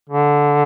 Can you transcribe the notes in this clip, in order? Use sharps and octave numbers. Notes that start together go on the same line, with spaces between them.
D3